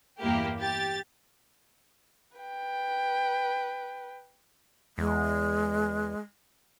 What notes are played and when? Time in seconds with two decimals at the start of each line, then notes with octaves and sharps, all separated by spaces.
0.21 E2 G2 A#3 E4 G4
0.59 G4 A6
2.37 B4 G5
4.98 E2 G#3